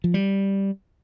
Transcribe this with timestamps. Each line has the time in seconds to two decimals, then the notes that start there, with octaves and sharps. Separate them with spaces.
0.04 F3
0.14 G3